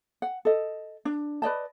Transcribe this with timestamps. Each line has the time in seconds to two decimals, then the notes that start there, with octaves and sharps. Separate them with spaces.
0.22 F#5
0.45 A4 D#5
1.05 D4
1.42 B4 D5 D#5 A5